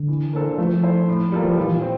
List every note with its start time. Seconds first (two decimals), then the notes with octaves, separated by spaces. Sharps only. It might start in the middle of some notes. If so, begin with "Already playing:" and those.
Already playing: D3
0.08 E3
0.33 A#3 D4 A4 C5
0.58 F3 A3
0.83 E4 A4 C5
1.08 A2
1.32 G3 A#3 F4 A4
1.45 F3
1.57 A#2 E3
1.82 C4